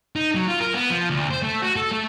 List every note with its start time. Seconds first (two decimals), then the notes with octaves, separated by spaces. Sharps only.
0.16 D#4
0.35 F#3
0.48 F4
0.61 A#4
0.74 B3
0.90 F3
1.10 D2
1.30 C5
1.42 A3
1.62 F#4
1.76 A4
1.92 A3